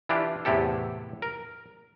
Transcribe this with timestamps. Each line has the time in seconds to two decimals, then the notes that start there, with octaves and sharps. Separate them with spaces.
0.09 E3 D4 E4 F4 G4
0.45 E2 A2 C3 E4 G4 A4
1.22 A#4